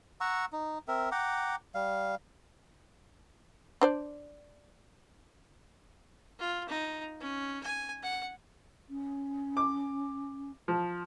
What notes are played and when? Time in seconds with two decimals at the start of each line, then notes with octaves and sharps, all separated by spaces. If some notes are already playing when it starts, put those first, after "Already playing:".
0.21 F#5 A#5 C#6 E6
0.52 D#4
0.88 C4 A#4 E5
1.12 F#5 G5 A#5 D6
1.75 G3 F5
3.81 D4 C5 D5
6.39 F4
6.68 D#4
7.20 C#4
7.63 G#5
8.03 F#5
8.89 C#4
9.57 D6
10.68 F3